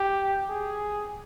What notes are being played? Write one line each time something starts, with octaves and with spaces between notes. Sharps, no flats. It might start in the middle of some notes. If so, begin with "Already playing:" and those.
Already playing: G4
G#4